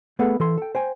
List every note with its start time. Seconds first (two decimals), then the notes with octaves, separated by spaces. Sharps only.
0.19 A3 B3 G#4 A4 B4 F#5
0.40 E3 A4 C6
0.58 A4 G5
0.75 C5 G5 G#5